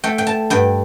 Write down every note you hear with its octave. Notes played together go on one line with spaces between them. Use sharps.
A3 G5
G5
A5
G2 G5